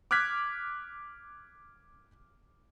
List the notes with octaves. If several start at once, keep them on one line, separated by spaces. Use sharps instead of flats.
D6 F6 F#6 G#6 B6